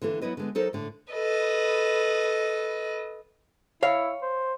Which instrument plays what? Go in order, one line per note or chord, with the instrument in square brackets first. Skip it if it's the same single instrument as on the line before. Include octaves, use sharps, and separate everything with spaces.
[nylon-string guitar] D3 E3 A#3 A4
F#3 B3 E4 B4 D#5
D3 G#3 B3
F#3 D#4 A4 A#4 C5
A2 D3
[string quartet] A4 B4 D#5
[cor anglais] E4 [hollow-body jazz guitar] C#5 F5
[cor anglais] C5